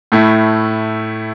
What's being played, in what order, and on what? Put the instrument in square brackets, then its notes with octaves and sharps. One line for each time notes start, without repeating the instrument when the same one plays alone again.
[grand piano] A2 A3 E4